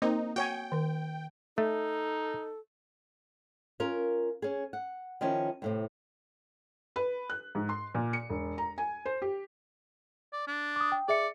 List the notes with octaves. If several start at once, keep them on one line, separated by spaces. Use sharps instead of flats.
A#3 C4 D#4 A#4
F#4 C#5 G5 G#5
D#3 A#4
A3 D#4 A4
C#4 F4 A#4
C#4 G#4
F#5
D#3 F3 C#4 E4
D#2 A2 C3
B4
F#6
G#2
C6
A#2
C#7
E1
A#5
G#5
C5
G4
D5
D4
D6 D#6
G5
G#4 D5 E5 C#7